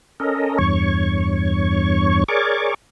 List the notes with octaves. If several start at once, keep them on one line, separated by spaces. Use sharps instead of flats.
C#4 A4 A#4 D#5
E2 G2 C#5 C#6
G#4 A#4 C#5 D5 C#6 D6